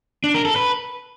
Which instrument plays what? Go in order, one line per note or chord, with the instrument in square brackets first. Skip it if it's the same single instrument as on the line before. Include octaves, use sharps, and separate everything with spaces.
[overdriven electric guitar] D4
A#4
A4
B4